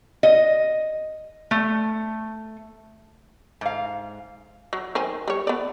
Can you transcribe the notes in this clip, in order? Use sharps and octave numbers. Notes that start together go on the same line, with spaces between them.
D#5
A3
G#2 F5
F#3
D#3 C5 G#5
G3 C#5
B3 D5